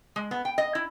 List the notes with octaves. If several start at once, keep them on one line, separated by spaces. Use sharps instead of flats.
G#3
B3
G5
D#5
E4